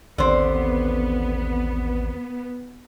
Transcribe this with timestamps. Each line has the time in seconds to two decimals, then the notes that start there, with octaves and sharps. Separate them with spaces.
0.18 A1 D#2 D3 B3 C4 C5